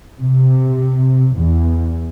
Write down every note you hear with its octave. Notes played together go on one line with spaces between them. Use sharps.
C3
E2